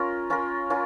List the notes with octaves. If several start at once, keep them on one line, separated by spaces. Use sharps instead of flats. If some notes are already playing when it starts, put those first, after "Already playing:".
Already playing: C#4 F4 A#4
C#4 F4 A#4
C#4 F4 A#4